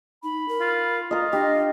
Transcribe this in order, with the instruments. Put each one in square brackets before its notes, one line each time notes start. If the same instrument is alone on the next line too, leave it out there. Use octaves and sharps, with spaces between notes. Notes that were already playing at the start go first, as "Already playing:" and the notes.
[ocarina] D#4 [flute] B5
[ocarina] A#4
[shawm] F4
[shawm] F4 [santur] A#4 D#5
[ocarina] D4 [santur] G4 [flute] D#5